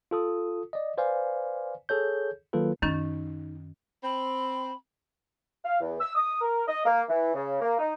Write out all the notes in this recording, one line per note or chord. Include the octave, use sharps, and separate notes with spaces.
F4 A4 D#6
D5 D#5
B4 C5 D5 F5 G#5
G#4 A4 C#5 G6
D#3 F#3 A#3 F4 A4 B4
F#2 D#3 C#4 D#4
C4 B5
F5
E2
E6
D#6
A#4
D#5
A#3
E3
C#3
A#3
D#4